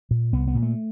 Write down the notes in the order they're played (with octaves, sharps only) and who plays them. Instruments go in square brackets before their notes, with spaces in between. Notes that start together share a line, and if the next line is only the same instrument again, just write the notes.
[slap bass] A#2
C2 B3
B3
A#2
A3